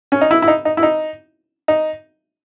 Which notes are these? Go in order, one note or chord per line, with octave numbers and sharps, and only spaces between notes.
C#4
D#4
E4
E4
D#4
D#4
E4
D#4
D#4